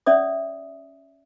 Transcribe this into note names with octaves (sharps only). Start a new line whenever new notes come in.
C#4 C#5 D5 E5 D#6